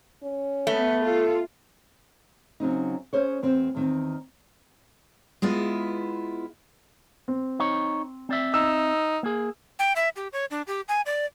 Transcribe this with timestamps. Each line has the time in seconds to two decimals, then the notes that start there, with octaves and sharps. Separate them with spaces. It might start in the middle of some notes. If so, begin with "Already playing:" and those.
0.22 C#4
0.67 A3 B3 B4
1.02 F4 A4
2.60 C#3 F#3 C4 D#4
3.13 C#4 G#4 C5 C#5
3.42 E2 C4 C5
3.75 E2 D#3 C4
5.42 G#3 B3 E4 F4
7.28 C4
7.59 D#4 C#5
8.29 C4 D5 E5
8.54 D#4 E6
9.23 A#3 G#4
9.79 G5
9.96 E5
10.16 G4
10.33 C#5
10.51 D4
10.67 G4
10.88 G#5
11.06 D5